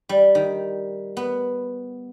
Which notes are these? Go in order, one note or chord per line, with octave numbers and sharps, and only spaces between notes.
G3
D#3
B3